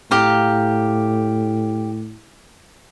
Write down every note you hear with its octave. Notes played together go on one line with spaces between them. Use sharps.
A2 G4 F5 A#5